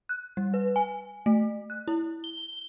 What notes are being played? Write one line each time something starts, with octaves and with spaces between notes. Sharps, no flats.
F#6
G3
B4
G#5
A3
F#6
E4
G7